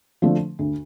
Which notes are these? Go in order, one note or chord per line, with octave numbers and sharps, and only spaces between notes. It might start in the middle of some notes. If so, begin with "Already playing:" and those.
D3 F3 A3
D2